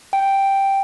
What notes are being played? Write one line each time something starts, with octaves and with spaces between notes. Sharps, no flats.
G5